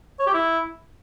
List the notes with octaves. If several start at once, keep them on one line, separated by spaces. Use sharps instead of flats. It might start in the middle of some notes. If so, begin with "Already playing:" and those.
C#5
G4
E4